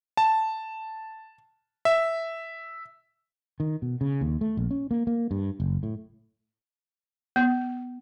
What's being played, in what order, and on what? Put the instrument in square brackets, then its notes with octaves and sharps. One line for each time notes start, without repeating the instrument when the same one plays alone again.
[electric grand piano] A5
E5
[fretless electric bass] D#3
B2
C#3
D#2
A3
A#1
C#4
A#3
A#3
G2
F#1
A2
[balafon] B3